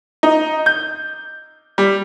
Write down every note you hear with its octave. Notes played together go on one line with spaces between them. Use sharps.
D#4
G6
G3